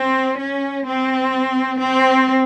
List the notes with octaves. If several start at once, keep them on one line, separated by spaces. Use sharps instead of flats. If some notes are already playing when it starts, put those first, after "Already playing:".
Already playing: C4
C#4
C4
C4